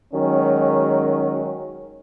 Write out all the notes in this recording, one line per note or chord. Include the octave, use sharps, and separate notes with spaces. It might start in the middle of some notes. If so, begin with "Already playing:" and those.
D#3 F#3 G#3 C#4